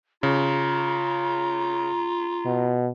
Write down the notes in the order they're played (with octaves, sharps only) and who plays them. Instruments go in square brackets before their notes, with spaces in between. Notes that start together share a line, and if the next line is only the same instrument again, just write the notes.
[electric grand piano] C#3 [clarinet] F4 [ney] A#5
[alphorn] B2